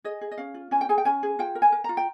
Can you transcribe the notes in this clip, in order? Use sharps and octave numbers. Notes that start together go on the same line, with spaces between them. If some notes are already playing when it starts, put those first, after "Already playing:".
G#4 D#5
G#4
D#5
C#4 F5
F4
C#4 G#5
G5
G#4 G#5
G5
C#4 G#5
G#4
F4 G5
A#4
G#5
A#4
F4 A#5
G5